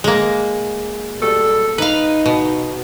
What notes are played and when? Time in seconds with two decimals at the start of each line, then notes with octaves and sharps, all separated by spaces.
0.04 G#3 A#3
1.19 B2 G3 A4
1.78 D#4 B4 F5
2.26 B2